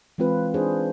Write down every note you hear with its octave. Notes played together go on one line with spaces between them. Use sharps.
E3 G#3 C4 F4 B4
D4 D#4 G#4 C5